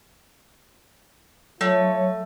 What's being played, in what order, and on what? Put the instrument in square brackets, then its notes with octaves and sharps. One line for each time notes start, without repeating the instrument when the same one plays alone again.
[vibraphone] F#3 [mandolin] A3 [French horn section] F4 C#5